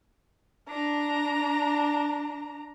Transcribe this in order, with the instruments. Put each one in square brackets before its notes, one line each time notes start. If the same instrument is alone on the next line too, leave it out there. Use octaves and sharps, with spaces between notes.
[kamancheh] D4 A#5